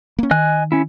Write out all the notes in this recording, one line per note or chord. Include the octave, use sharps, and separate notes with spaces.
A#3 C#4
D#3 D#5 G#5 F#6
C#4 E4